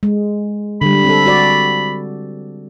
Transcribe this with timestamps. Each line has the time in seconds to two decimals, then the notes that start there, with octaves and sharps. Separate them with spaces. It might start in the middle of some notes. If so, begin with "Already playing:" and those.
0.03 G#3
0.81 D3 G3 B5
1.05 C4 A4
1.26 F#4 D5